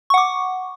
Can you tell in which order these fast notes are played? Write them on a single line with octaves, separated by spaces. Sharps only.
C#6 F#5 D6